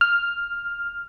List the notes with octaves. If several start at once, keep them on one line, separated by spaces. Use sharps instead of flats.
F6